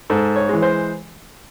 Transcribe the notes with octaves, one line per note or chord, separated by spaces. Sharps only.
G#2 A4
C#5
E3 G#3
C5